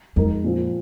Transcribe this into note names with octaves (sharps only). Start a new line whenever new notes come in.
F2 G#3 D#4 A#4
A#2 F3 C4